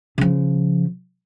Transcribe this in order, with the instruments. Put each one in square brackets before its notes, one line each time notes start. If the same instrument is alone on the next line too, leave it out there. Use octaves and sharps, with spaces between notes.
[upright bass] C#3 F3